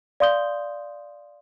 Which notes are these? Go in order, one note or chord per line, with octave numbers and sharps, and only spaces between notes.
D5 F5 C6 D#6 G6 G7